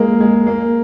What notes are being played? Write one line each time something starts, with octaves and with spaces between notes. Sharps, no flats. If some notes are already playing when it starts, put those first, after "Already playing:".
Already playing: G#3 A#3
G#3
A#3